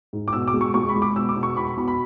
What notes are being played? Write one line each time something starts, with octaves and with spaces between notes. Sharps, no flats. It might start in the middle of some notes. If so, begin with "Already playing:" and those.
G#2
D6
B2 E6
D6
G#3
C#6
G#3 C#6
B5
G#3
D6
B2 E6
D6
B2
C#6
B2 B5
B5
B2 B5
B5